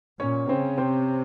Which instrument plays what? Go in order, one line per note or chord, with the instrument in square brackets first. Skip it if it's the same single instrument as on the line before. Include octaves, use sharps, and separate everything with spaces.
[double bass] A#2 [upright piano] C#4 C#5
[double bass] C#3 [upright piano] C4 C5
[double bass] C3 [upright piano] C4 C5